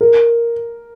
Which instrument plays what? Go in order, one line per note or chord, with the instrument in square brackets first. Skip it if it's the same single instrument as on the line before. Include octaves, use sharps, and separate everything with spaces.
[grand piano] A#4